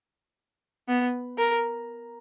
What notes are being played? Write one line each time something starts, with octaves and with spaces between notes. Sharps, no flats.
B3
A#4